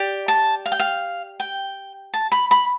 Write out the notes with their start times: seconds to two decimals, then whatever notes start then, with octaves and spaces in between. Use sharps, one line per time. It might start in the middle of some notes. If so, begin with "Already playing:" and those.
Already playing: G4 D5
0.28 A5
0.66 F5
0.72 G5
0.80 F5
1.40 G5
2.14 A5
2.32 B5
2.51 B5